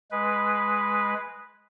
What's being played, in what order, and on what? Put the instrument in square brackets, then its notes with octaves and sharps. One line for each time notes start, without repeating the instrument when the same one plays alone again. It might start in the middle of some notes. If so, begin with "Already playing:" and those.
[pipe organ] G#3 B4